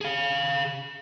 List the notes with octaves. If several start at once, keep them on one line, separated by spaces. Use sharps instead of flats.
G#4 F5